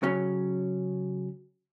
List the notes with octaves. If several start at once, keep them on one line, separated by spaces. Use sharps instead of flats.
C#3 F#3 C#4